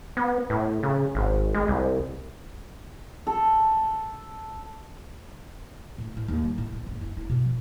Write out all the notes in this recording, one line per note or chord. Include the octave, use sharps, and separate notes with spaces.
B3
A2
C#3
G#1
G#3
C2
A4
A2
A2
D#2
G3
A2
B3
F#1
E4
E4
B2
F3